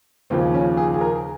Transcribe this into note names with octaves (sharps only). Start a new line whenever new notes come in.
D#2 C#3 F3 C4
C#4
G#4
G#4
A#4